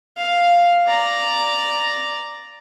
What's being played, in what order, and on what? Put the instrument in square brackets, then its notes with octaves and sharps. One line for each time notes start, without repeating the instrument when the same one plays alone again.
[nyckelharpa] F5
D5 A#5